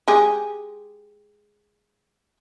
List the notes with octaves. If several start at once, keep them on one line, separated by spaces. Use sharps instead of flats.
G#3 G4 G#4